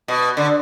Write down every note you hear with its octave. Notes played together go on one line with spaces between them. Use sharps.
B2
D3